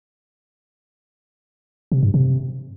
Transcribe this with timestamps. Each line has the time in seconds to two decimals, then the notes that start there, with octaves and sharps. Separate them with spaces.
1.92 C3
2.03 G2
2.14 C3